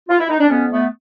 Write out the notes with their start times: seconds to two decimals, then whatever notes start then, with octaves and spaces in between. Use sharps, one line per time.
0.09 F4
0.19 E4
0.29 D#4
0.40 D4
0.50 F2 B3 C#4
0.71 A3 B3